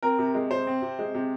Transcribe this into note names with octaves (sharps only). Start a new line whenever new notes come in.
C4 A#4
C3
G#3
C3 C5
C4
C3
G#3
C3